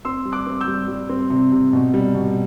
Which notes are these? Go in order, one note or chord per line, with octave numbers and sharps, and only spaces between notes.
C4 C6 E6
G3
D6 F#6
C4
E6 G6
G3
G3
C4
C3
C3
B2
G3
B2